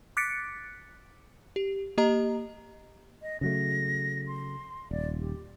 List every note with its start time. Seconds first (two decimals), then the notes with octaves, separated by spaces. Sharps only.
0.17 D6 F#6 A6 B6 C#7 D7
1.56 G4
1.98 A#3 G4 D#5 A#5
3.22 D#5
3.41 C#3 F#3 A3 A#6
4.27 C6
4.91 D#1 D5
5.19 G4